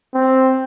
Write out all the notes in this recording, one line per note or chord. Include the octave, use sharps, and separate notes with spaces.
C4